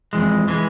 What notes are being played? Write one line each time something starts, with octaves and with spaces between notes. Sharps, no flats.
F2 E3 G#3
E3 G#3